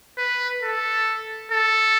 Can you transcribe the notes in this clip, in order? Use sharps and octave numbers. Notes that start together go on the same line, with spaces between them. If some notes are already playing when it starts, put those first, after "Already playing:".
B4
A4
A4